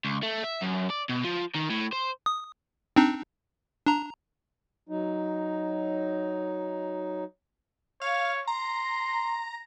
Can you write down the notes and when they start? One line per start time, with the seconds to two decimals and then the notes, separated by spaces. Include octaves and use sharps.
0.05 C#2
0.23 A3
0.43 E5
0.61 F#2
0.90 D5
1.09 B2
1.24 F3
1.55 D#3
1.70 A2
1.92 C5
2.26 D#6
2.96 C4 D4 D#4
3.86 D4 A#5
4.89 F#3 D#4
8.01 C#5 F5
8.47 A#5 C6